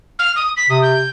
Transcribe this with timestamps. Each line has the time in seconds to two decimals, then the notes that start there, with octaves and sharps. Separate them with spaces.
0.19 F6
0.36 D#6
0.57 B6
0.70 C3 D#6
0.82 G6